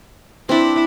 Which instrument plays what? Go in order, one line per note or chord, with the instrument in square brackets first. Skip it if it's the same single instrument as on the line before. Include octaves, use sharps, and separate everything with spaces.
[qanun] C4 D4 [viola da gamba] E4